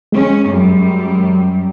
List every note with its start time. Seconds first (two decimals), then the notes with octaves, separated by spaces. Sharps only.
0.12 G#3 C#4
0.47 F#2 G3